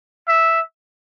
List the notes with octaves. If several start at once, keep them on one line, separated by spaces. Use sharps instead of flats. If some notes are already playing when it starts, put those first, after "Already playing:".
E5